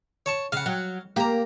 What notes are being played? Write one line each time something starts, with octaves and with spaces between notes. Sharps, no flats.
C#5 A5 C#6
C#3 F5 F#5
F#3
A#3 G4 A#5